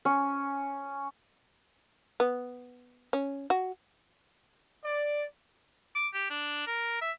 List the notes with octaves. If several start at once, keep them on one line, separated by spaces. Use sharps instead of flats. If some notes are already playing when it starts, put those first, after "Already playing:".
C#4
B3
C#4
F#4
D5
D6
G4
D4
A#4
E5